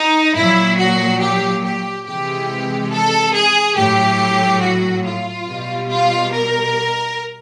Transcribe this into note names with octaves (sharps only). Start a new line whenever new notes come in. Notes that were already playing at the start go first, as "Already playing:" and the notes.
Already playing: D#4
A#2 F#3 E4
F#4
G4
G4
C3 E3 G#3 G4
A4
G#4
A2 F#3 G4
F#4
F4
B2 G3
F4
A#4